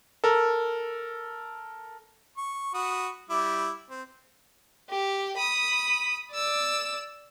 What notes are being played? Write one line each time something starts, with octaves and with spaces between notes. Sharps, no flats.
A4 A#4
C#6
F#4 B5 D#6
G3 E4 D6
C4
G4
B5 D#6
D5 E6